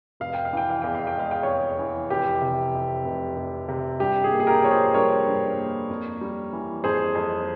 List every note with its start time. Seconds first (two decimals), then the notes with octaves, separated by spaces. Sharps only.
0.20 F1 F5
0.34 G5
0.45 F5
0.53 E3 G5
0.70 F5
0.82 E2 G5
0.95 F5
1.07 G5
1.16 G#3 F5
1.31 G5
1.43 F1 C#5 F5
1.79 E3
2.10 F1 G4
2.42 C3
2.74 F2
3.05 F1
3.36 F1
3.69 C3
4.00 G2 G4
4.24 G#4
4.31 A#3
4.40 G#4
4.47 G4 A#4
4.63 F3 C#5
4.71 G#4 C5
4.94 G2 A#4 C#5
5.26 G2
5.58 A#3
5.89 F2
6.21 G3
6.53 E3
6.84 F2 G#4 C5
7.15 F2